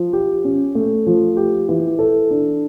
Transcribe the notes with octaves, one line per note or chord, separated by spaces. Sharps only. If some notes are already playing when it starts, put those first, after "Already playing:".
Already playing: F3
G4
C#4
A3
F3
G4
E3
A4
D4